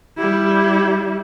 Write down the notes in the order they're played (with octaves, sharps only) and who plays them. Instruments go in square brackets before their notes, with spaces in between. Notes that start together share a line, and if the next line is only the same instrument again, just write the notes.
[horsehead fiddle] G3 E4